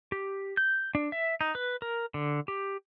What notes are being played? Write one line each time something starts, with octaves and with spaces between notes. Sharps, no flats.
G4
G6
D4
E5
D#4
B4
A#4
D3
G4